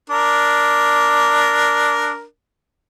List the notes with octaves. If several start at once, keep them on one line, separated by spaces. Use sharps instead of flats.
D4 A#4